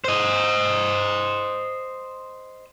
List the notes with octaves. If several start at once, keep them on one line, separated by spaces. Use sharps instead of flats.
C5 D#5